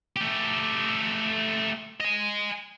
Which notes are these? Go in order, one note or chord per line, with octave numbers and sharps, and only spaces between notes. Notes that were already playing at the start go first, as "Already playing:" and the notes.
A3 G4
D#5 G#5